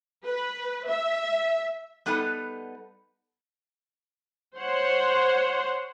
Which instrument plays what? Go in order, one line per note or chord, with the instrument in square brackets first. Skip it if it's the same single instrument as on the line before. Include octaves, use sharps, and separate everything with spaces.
[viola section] B4
E5
[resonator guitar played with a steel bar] G3 B3 D#4 A4 B4 F#5
[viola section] C5 C#5 F#5